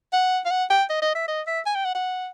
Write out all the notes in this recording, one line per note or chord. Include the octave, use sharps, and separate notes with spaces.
F#5
F5
F#5
G5
D#5
D#5
E5
D#5
E5
G#5
G5
F#5
F#5